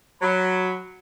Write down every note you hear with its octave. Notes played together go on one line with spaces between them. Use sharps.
F#3 B5